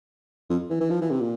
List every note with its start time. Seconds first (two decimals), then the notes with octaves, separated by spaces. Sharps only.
0.50 F2
0.70 E3
0.80 E3
0.90 F3
1.01 E3
1.11 C3
1.21 A#2